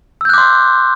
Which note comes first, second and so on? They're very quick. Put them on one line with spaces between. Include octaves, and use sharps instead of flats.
E6 G6 F#6 D6 C6